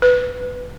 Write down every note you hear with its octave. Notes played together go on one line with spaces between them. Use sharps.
B4